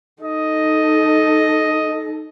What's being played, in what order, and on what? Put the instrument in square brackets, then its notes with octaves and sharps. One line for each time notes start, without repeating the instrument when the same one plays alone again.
[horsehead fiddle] D#4 A4 [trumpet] D#5